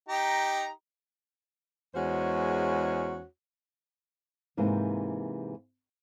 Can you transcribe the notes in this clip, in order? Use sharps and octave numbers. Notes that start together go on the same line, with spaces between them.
D#4 G4 A#5
E2 G#3 C#4 F#4 C5 C#5
G#2 C3 E3 A#3